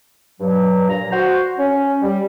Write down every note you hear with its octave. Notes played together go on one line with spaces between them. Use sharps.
G2 F#3
A#2 A#5
F#4 C5
C#4
G3